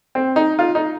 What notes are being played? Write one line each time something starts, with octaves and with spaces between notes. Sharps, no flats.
C4
D#4
F4
D#4